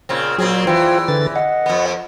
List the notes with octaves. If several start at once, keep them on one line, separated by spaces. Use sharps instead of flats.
A#2 C#3 C4
A#2 F#3 C4 G#4
E2 E3 F4 C5 G5
D3 B4 A6
D#5 F#5
F2 B3